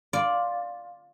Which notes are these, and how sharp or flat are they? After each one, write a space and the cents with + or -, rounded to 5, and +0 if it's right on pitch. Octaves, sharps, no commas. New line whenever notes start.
F4 +10 D5 +0